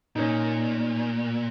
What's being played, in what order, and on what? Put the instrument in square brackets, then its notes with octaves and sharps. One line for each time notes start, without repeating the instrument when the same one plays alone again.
[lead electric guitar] A#2 [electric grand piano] C#4 D#4